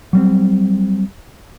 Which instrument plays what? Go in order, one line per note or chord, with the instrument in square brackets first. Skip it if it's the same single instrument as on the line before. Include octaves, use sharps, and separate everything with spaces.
[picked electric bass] F#3 G3 C4